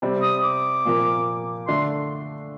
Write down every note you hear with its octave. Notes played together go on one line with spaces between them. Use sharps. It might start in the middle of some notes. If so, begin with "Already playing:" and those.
C3 G3 C4
D#6
D6
A#2 F3 A#3
D3 A3 D4 C6